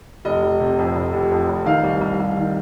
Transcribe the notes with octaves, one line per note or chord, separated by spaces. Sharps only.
F1 D#5
F1
C3
F2
F1
F1
F2
F1
D#3 F5
C2
C2
C2
D#3